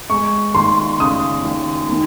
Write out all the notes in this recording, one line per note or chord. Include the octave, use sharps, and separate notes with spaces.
G#3 C#6
D#2 C6
C#3 D#6
D#2
D#3